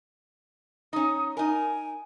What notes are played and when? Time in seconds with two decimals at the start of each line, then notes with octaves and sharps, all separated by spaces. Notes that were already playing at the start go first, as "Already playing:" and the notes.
0.93 C#4 D#4 D#6
1.37 D#4 A#4 G#5